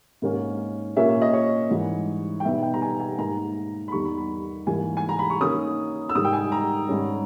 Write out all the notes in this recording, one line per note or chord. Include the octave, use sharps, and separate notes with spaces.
G#2 D#3 A#3 C#4
A#2 A#3 C#4 E5
E5
D#5
C#5
G#2 E3 G3
G5
B2 G3 B3 D#4 E5
G5
A#5
G#5
G#5
G#2 D#3 A#3 A#5
B5
E2 D#3 G3 C#6
B5
B5
G#2 E3 G3 A#3 G#5
G#5
A#5
B5
C#6
D#3 A#3 C#4 D#6
E6
G#2 D#3 G3 D#6
G5
G#5
A#5
G#2 G3 C#4